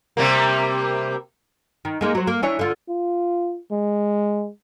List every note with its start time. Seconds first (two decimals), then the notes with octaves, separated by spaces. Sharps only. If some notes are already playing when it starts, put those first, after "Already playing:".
0.17 C3 G3 A#3
1.85 D#3
2.01 G#3 A#3 D#4
2.15 F#3 C5
2.27 A#3
2.43 E3 D4 C#5
2.59 D3 F4
2.89 F4
3.71 G#3